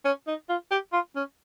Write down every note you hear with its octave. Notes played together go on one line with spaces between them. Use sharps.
C#4
D#4
F4
G4
F4
C#4